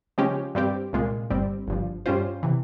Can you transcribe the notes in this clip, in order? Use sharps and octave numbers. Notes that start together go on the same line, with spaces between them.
C#3 F3 G#3 C#4 G4
G2 G3 C4 G4
C2 A#2 G#3
G1 G2 G3 C4
G1 G2 F3
G2 G3 C#4 F4 C5
C3 E3